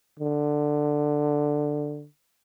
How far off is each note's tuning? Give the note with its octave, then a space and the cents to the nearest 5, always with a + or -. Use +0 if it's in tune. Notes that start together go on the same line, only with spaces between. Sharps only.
D3 +10